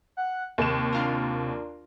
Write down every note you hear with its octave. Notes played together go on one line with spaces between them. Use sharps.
F#5
D#2 C3 E7
D4 F4 A#4